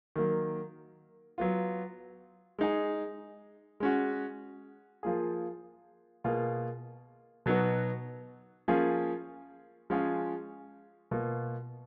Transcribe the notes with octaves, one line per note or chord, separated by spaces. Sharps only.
D#3 F#3 A#3
F#3 B3 F4
G#3 D#4 G#4
G#3 C#4 F#4
F3 A#3 F4 G#4
B2 A#3 F4 G#4
B2 F#3 B3 D#4 F#4
F3 A#3 C#4 F4 G#4
F3 G#3 C#4 F4 G#4
B2 A#3 F4